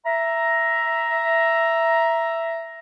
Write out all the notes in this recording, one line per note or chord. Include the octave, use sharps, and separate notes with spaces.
E5 A#5